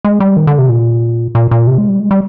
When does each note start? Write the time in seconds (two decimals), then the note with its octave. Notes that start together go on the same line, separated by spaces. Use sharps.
0.05 G#3
0.20 G3
0.37 D#3
0.47 D3
0.58 C3
0.69 A#2
1.35 A#2
1.51 A#2
1.67 C3
1.78 G#3
1.89 G3
2.00 G#3
2.11 G3